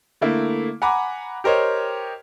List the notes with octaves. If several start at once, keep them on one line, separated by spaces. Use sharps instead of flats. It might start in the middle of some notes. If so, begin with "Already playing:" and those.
D3 A3 A#3 E4
F#5 G#5 A#5 B5 D6
G4 A#4 C5 C#5 D#5